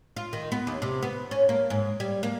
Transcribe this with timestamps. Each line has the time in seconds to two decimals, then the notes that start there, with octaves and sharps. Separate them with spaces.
0.17 F4
0.33 D#3
0.52 B3
0.67 D#2
0.82 C3
1.03 B3
1.31 C#4
1.49 A#3
1.70 G#2
2.00 G3
2.23 A#3